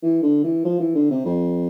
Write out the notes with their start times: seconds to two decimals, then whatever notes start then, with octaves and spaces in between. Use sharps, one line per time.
0.03 E3
0.22 D3
0.44 E3
0.65 F3
0.79 E3
0.95 D3
1.11 C3
1.25 F2